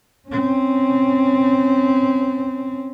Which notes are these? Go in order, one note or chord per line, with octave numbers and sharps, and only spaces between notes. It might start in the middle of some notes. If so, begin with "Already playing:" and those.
C4 C#4